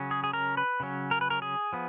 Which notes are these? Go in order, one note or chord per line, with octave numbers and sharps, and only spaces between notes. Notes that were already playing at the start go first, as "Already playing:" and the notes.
Already playing: C#3 F#3 C#4
G#4
G#4
A#4
B4
C#3 F#3 C#4
A#4
B4
A#4
G#4
F3 B3